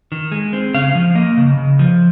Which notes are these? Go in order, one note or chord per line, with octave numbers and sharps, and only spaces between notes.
D#3
G#3
C4
C#3 F5
F3
A#3 D#5
C#3
C#3
F3